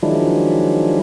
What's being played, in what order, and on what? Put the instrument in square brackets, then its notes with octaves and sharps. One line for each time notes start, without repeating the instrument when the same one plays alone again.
[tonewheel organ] D#3 F3 F#3 G#3 D4 E4